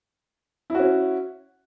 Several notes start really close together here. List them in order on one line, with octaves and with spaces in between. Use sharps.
E4 F#4 C#4